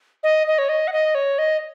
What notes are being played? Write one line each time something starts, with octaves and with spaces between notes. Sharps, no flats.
D#5
D#5
C#5
D#5
F#5
D#5
C#5
D#5